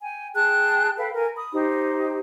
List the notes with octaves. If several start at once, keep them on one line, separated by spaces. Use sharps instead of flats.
G5 G#5
G#4 G5 A5 F#6
A4 B4 F5 G5
A#4 G#5
B5 D#6
D#4 G4 C5